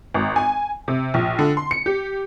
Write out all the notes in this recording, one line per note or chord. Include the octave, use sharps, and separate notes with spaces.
G#1
G#5
C3
A#1
D3
C6
C#7
G4